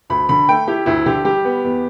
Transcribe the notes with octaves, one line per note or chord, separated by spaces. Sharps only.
D2 B5
D3 B5
A3 G5
E4 G4
D2 E4
D3 G4
G3 G4
B3
E2